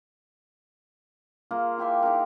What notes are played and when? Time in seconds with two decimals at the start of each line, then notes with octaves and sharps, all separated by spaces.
1.51 A#3 F4 G#4
1.78 E4 G4 E5 C6
2.02 D#4 E4 G#4 A#4